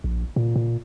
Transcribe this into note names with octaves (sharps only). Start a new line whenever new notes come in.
A#1
A#2
A#2